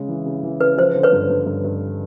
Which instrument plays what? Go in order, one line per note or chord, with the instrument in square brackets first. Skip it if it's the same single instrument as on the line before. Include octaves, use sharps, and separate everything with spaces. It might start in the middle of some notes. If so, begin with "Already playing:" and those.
Already playing: [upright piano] C#3 G#3
E3
C#3
E3
[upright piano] C#3 [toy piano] B4
[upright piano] F3 [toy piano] C5
[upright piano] D3
[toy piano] B4 C#5
[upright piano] G2
G2
G2
G2